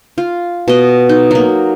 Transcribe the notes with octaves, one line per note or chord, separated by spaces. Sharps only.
F4
B2 D#5
D#4
F#3 A#3